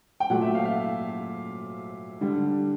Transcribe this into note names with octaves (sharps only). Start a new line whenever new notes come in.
G5
A#2 F#3 A3 F#5
E5
F5
F5
D3 G3